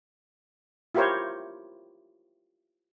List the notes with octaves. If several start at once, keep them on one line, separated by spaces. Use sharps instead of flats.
E4 F4 G4 A#4 C5 C#5